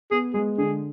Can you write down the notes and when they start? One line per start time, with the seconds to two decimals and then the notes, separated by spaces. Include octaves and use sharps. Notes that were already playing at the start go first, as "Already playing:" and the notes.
0.11 B3 G#4
0.34 G#3 G#4
0.58 D3 G#4